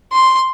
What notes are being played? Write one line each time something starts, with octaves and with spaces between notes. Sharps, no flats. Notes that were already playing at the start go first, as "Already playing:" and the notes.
C6